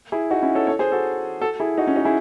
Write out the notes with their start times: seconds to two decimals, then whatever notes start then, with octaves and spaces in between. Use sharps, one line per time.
0.12 E4 G#4
0.30 D#4 F#4
0.42 C#4 E4
0.55 A4 C#5
0.67 A4 C#5
0.79 G#4 C5
0.92 F#4 A4
1.41 F#4 A4
1.60 E4 G#4
1.78 D#4 F#4
1.87 C#4
1.96 D#4 F#4
2.05 E4 G#4